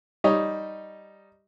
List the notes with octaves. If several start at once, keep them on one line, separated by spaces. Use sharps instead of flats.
G3 D#4 C#5 D#5